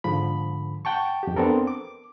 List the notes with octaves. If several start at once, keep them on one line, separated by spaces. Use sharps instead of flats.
G#2 D3 F3 B5
F#5 G5 A5 C#6
F2 G4
B3 C4 D4 A4 A#4
D6